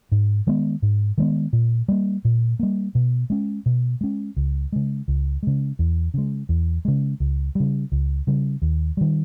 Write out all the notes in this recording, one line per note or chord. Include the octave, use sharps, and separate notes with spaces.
G#2
D#3 G#3 B3
G#2
D#3 G#3 B3
A#2
G3 A#3
A#2
G3 A#3
B2
G#3 C#4
B2
G#3 C#4
C#2
C#3 G#3
C#2
C#3 G#3
E2
C#3 G#3
E2
C#3 G#3
C#2
C#3 G3
C#2
C#3 G3
D#2
D#3 G3